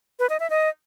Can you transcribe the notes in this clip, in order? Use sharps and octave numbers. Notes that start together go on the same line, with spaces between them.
B4
D#5
E5
D#5